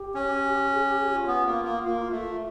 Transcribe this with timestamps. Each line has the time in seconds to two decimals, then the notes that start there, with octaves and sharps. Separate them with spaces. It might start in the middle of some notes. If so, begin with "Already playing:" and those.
Already playing: G4
0.15 C#4
0.72 G#4
0.86 G4
1.00 G4
1.08 F#4
1.13 F4
1.27 B3
1.46 A#3
1.65 A#3
1.83 A#3
2.11 A3